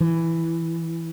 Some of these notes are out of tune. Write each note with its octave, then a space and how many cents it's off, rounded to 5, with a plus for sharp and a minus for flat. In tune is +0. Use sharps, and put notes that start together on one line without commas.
E3 +5